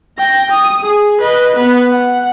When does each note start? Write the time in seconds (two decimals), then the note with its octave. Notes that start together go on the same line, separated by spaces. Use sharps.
0.18 G5 A#6
0.51 D#6
0.84 G#4
1.21 B4 D#5
1.56 B3 B4
1.92 F#5